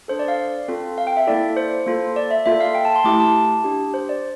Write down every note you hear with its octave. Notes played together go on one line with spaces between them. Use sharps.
D4 A4 C5
D5
F5
C4 F4 A4
F5
G5
E5
A#3 E4 A4 D5
C5
A#3 F4 A4
D5
E5
A#3 F4 A4 E5
F5
G5
A5
C6
A3 E4 G4 D6
A5
D4 G4
C5
D5